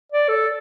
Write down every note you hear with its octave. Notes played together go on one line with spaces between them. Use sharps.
D5
A4